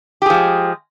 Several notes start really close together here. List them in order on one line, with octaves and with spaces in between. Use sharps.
G4 G#4 F3 G#3